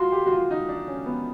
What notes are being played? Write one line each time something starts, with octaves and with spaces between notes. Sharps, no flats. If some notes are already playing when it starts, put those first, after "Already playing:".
Already playing: F4 F#4 C6
G4
F#4
F4
D#4
D4
C#4
B3